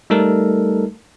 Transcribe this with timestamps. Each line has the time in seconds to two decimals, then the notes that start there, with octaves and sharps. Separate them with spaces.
0.10 G3 A3 D#4 A4 A#4